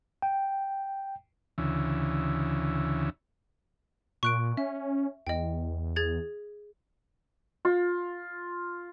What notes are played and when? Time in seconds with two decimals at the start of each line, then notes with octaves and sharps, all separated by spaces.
0.22 G5
1.58 D2 C#3 E3
4.23 A#2 C#6 F#6 D7
4.57 C#4 E5
5.27 E2 D#5 G5
5.96 G#4 G#6 A6
7.65 F4